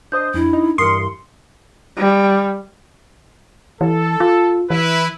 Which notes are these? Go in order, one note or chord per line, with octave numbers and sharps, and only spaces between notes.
D4 C5 D#5 D#6 G6
F2 D4 E4
D#4
G2 E3 A#4 C6 D#6 C#7
G3
E3 A4
F4
E3 E4 B4